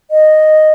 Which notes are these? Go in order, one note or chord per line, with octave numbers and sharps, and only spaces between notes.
D#5